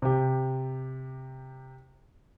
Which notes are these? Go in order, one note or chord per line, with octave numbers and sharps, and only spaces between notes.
C3 G4